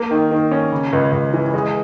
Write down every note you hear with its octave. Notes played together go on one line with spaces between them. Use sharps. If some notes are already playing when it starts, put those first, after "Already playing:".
Already playing: A#3
D#3
D#3
C#4
C#3
C#2
C#2
E3
G#3